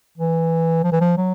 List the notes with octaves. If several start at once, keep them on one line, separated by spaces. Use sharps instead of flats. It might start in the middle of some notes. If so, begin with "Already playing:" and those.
E3
F3
E3
F3
F#3